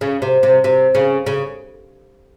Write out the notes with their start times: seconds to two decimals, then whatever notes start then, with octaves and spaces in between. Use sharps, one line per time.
0.01 C#3
0.22 C3
0.43 C3
0.64 C3
0.95 C#3
1.26 C#3